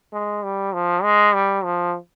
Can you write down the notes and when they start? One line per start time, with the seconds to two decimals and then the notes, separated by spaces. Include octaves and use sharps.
0.13 G#3
0.43 G3
0.73 F3
1.03 G#3
1.34 G3
1.64 F3